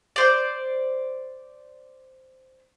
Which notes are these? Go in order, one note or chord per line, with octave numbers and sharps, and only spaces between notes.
C5 D5